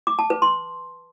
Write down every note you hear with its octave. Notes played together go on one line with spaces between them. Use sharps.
D6
A5
B4
C6